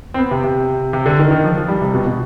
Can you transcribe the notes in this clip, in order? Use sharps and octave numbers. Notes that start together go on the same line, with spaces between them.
C4
B3
C3
C3
C3
D3
D#3
D#3
F3
F3
G3
C3
B2
B2